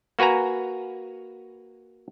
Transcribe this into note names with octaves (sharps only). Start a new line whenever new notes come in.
A#3 F#4 B4 G#5 A#5